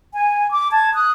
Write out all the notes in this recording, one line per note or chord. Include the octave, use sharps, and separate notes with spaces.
G#5
D6
A5 G#6
D#6 F#6